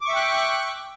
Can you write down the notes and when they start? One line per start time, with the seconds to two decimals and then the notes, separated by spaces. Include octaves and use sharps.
0.01 D6
0.05 C#6
0.09 E5
0.12 G5
0.16 F#6